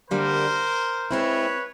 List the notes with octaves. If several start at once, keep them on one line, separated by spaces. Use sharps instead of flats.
D3 G3 A#3 A#4 C5
G#3 C4 E4 B4 C#5